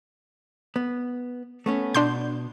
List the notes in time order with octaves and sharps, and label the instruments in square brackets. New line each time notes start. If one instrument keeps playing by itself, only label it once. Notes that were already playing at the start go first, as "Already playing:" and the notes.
[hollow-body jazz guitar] B3
A3 B3 C#4
[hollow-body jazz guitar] B2 [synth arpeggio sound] D4 C6 G6